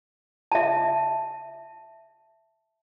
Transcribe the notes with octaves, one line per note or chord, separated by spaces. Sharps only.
E5 A5